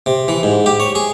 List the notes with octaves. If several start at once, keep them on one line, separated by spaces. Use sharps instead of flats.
C3
E3
G#2
G4
C#5
G#4